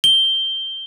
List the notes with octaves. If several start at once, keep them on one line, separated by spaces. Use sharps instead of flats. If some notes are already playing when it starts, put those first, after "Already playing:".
G7